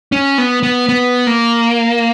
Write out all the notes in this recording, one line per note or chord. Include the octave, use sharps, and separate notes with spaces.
C#4
B3
B3
B3
A#3